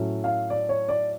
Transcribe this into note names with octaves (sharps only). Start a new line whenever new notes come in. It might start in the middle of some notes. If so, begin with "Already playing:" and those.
Already playing: A2 F#3 A3 C#4
F5
D5
C#5
D5